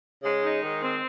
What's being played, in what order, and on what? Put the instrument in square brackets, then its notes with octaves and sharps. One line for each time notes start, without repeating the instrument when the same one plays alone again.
[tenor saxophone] C#3 [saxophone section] G#3
[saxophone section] D#4
[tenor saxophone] D#3 [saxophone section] G#3
[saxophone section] C4